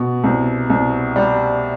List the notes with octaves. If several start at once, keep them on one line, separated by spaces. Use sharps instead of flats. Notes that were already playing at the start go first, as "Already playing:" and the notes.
Already playing: B2
C2
C2
G3